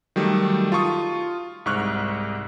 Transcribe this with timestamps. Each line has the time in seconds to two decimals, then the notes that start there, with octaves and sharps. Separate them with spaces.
0.16 D#3 F#3 G3 A3
0.72 F4 A5 C#6 D#6
1.66 C2 G#2 C#6 F6 F#6